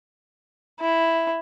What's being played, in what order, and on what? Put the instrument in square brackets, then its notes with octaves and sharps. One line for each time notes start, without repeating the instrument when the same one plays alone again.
[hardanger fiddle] E4